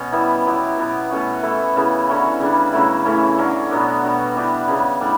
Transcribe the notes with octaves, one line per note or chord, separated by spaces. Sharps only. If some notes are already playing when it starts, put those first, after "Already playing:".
Already playing: B2 C#4
E3 G3 B3 E4
F#3 B3 E4 G4
B2 F#3 B3
B2 A3 C#4 F#4
E3 A3 E4
C#3 E3 B3
D3 F#3 C#4 E4
C#3 G3 D4
C#3 F#3 A3 E4
A2 E3 A3 C#4
D3 F#3 C#4
B2 F#3 B3 D4
B2 G3 D4 F#4
E3 B3 D4 G4
C#3 F#3 B3
A2 G3 D4